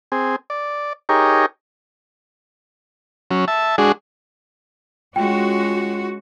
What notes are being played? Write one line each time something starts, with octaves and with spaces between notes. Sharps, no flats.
C4 G#4
D5
D#4 G4 G#4 A#4 C#5
F#3 C#4
E5 A5
G#3 D4 F#4 G#4
G#3 C#4 F4 F#4 G5